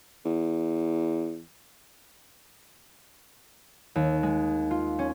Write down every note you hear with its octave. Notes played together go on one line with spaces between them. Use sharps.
E2
D#2
G#3
F4
C#4